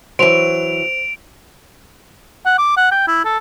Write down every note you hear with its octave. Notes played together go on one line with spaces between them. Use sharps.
E3 F#3 C5 D7 F7
F#5
D6
F#5
G5
E4
A4